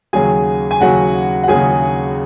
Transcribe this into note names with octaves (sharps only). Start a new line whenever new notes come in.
D#2 C#3 F#3 G#4 G#5
G#5
D#2 C#3 F#3 F#4 F#5
F#5
D#2 C#3 F#3 G#4 G#5